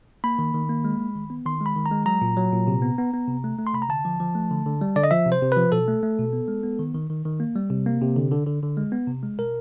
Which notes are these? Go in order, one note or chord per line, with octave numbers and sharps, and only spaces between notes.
A#3 B5
D#3
D#3
A#3
G#3
G#3
D#3
B3
D#3 C6
G#3
B5
D#3
A#5
G#3
F#3 A#5
A#2
F#3
A#2
C3
B3
B3
B3
C3
A3
A3
C6
C3 B5
A#5
D3 A5
F3
F3
A3
D3
D3
G3
D3 D5
D#5
F3 E5
C3
C5
C3
F3 B4
B2 A4
A3
A3
B2
B3
G#3
B3
D#3
D#3
D#3
D#3
A#3
G3
C3
A#3
C3
D3
D3
D3
D3
G#3
B3
C3
G#3
B2 A#4